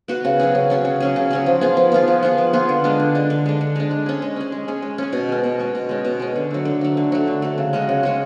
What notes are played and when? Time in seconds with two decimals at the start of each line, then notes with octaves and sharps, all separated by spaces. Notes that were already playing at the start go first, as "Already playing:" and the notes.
0.08 B3 F#4 B4
0.25 C#3
0.40 F#3 C#4 G#4
0.55 C#3
0.70 F#3 C#4 G#4
0.85 C#3
1.00 F#3 C#4 G#4
1.16 C#3
1.31 F#3 C#4 G#4
1.46 F3
1.61 B3 F4 G#4
1.77 F3
1.92 B3 F4 G#4
2.08 F3
2.23 B3 F4 G#4
2.38 F3
2.53 B3 F4 G#4
2.69 D3
2.84 G#3 D4
2.99 D3
3.15 G#3 D4
3.30 D3
3.46 G#3 D4
3.61 D3
3.76 G#3 D4
3.91 G#3
4.06 C#4 G#4
4.22 G#3
4.36 C#4 G#4
4.52 G#3
4.68 C#4 G#4
4.82 G#3
4.98 C#4 G#4
5.12 B2
5.29 G#3 C#4
5.44 B2
5.59 G#3 C#4
5.75 B2
5.89 G#3 C#4
6.05 B2
6.20 G#3 C#4
6.36 D3
6.51 F#3 A3
6.65 D3
6.81 F#3 A3
6.97 D3
7.12 F#3 A3
7.27 D3
7.42 F#3 A3
7.58 C#3
7.73 G#3 C#4 F#4
7.89 C#3
8.03 G#3 C#4 F#4